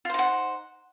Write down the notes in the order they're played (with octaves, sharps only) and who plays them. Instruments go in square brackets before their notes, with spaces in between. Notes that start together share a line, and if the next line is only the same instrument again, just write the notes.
[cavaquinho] F4
C5
D#4
F#5